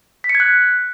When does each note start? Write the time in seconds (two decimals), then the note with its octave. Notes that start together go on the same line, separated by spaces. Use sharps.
0.24 B6
0.29 C#7
0.35 G#6
0.40 F#6